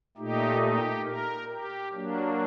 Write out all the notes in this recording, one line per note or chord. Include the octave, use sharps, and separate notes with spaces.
A#2 A3 D#4 G4
G4
A#4
G4
F#3 A#3 D4